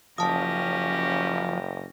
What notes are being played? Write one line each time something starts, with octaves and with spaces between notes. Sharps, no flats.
F#1 F3 C#4 G4 A5 D#6 A#6